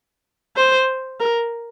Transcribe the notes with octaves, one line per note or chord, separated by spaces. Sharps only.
C5
A#4